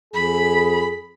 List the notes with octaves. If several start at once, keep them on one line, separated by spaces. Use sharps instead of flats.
F2 G#4 B5